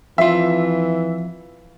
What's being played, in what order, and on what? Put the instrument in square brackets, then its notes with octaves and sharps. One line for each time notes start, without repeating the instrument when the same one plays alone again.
[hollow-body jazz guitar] F2 F4 [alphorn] E3 [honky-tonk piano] E5